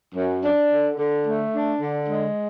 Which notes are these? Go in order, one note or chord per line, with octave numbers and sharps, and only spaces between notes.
F#2
D4
D3
D3
A3
D4
D3
G#3